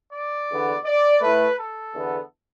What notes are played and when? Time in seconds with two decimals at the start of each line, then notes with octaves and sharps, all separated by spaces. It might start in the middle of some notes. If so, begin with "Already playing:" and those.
0.13 D5
0.50 E2 D3 B3
0.85 D5
1.21 A2 A3 B4
1.58 A4
1.93 E2 D3 B3